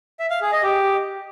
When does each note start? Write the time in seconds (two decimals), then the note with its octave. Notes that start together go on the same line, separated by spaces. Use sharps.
0.19 E5
0.30 F5
0.41 G#4
0.52 D#5
0.63 G4